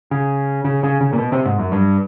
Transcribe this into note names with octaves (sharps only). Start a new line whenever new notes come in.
C#3
C#3
C#3
C#3
A#2
B2
C3
G#2
F#2
G2